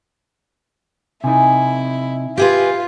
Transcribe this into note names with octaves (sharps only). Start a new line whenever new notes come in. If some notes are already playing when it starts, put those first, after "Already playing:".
C3 D#4 E4 G#5
F4 G4 G#4 B4